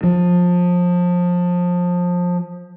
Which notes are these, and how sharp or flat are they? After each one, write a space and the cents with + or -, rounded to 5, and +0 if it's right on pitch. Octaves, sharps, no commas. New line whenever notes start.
F3 +25